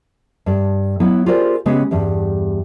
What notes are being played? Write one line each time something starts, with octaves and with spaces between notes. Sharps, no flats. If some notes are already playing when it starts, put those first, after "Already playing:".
G2 D5
F#3 B3 E4
F4 G4 G#4 A#4 C5 D5
C#3 G#3 B3 G4 B4
E2 G2 G3